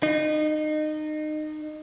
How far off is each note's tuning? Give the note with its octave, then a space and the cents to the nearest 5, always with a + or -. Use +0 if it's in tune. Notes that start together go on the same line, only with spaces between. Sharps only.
D#4 -25